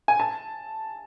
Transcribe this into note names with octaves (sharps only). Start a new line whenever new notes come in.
G#5
A5